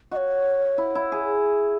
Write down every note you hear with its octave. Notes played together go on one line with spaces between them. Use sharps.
F#4 D#5
C#5
E4
E4
G#4